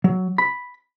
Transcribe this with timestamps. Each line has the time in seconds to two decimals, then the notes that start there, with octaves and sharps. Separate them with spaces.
0.04 F#3
0.38 B5